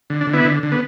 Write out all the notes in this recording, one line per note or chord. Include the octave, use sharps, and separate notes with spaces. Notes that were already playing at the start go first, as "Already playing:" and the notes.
D3
D4
D3
B3 E4
D3
D3
B3